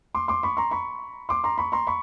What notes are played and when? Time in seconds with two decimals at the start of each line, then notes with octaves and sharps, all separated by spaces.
0.15 C6 D6
0.28 C6 D6
0.43 B5 C#6
0.57 A#5 C6
0.71 B5 C#6
1.29 C6 D6
1.44 A#5 C6
1.58 B5 C#6
1.72 A#5 C6
1.87 B5 C#6